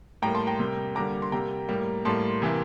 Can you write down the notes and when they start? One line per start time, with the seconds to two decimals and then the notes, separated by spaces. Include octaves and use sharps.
0.22 A2 G3 A#3 G5 A#5
0.35 A5 C6
0.47 G5 A#5
0.59 C3 G3 A#3
0.95 D3 G3 A#3 A#5 D6
1.22 C6
1.32 C3 G3 A#3 G5 A#5
1.69 A2 G3 A#3
2.05 A2 G3 A#3 A5 C6
2.42 C3 E3 A#3